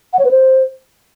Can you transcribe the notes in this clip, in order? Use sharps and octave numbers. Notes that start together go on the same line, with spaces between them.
F#5
C#5
B4
C5